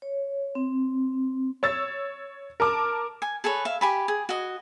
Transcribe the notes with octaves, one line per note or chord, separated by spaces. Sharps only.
C#5
C4
C#5 E6 A6
A#4 A5 D6
G#5
G#4 A4 B4 C#5
E5 F5
G4 G#5 B5
G#4
F#4 D#5